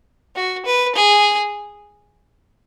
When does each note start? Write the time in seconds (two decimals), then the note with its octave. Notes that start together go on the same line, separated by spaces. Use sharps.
0.36 F#4
0.66 B4
0.95 G#4